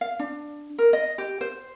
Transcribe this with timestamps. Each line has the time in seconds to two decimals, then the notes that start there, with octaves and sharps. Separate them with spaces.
0.01 F5
0.19 D4
0.78 A#4
0.93 D#5
1.18 G4
1.41 C5